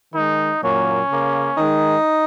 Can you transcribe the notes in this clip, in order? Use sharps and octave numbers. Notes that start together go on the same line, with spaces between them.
D#3 G#3 D#4
A#2 F#3 A#3 C#4
C#3 A#3
D#3 G#3 D#4